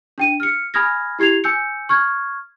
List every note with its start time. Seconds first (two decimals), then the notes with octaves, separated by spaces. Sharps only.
0.18 D4 G5 D#7
0.40 F6 C#7
0.74 G#5 B5 D#6 F6 G#6 A#6
1.19 E4 G4 G#6 C7 F7
1.44 G#5 E6 G6 C#7
1.89 C#6 F6 G#6